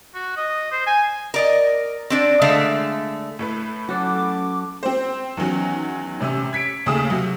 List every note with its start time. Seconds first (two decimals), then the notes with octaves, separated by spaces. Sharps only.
0.15 F#4
0.37 D#5
0.72 C5
0.87 G#5
1.34 A#4 D5 D#5
2.10 C4 D4 D5
2.42 D3 G#3 A3 F5
3.39 A2 A3 B4
3.89 F#3 C#4 F#4 A4 D6
4.83 C4 C5
5.37 E2 D#3 F#3 C#4
6.20 A1 C3 C#4 E6
6.53 G#6 B6 C#7 D7
6.86 D#2 C#3 A3 G#4 D#6 E7
7.10 C3 F#3